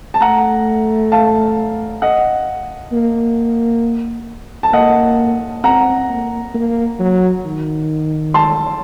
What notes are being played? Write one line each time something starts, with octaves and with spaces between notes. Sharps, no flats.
A5
A3 F#5 A#5
F5 A5
D#5 F#5
A#3
A5
A#3 D#5 F#5
C4 F#5 A#5
A#3
A#3
F#3
D#3
A5 C6